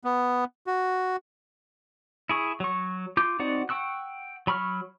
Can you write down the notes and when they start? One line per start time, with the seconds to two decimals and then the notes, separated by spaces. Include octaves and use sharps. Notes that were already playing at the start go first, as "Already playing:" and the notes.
0.04 B3
0.67 F#4
2.29 E4 G#4 C#6
2.60 F#3 C#6
3.17 F4 D6 G6
3.39 C4 D#4 F#4 D5 F#5
3.69 F#5 G5 C#6 E6 F#6
4.47 F#3 B5 C#6 F6